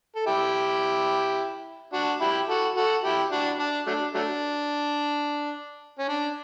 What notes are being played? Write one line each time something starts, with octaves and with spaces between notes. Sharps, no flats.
A4
E4 G4
D4 F#4
E4 G4
F#4 A4
F#4 A4
E4 G4
D4 F#4
D4
F#3 A3 D4
F#3 A3 D4
C#4
D4